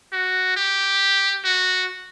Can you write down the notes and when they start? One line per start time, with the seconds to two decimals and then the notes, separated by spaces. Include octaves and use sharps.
0.12 F#4
0.56 G4
1.45 F#4